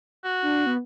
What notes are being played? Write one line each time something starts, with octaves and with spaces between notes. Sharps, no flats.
F#4
D4
B3